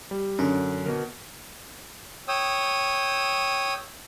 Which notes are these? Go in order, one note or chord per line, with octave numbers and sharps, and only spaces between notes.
G3
F#2 D3 C#4 D4
B2 D3 A#4
C#5 G5 D#6 E6